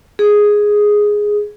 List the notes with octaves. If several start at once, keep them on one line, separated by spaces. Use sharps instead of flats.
G#4